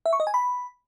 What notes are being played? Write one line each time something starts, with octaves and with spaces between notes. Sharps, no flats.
E5
C#6
D#5
G#5
B5